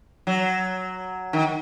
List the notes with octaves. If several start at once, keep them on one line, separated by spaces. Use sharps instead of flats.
F#3
D#3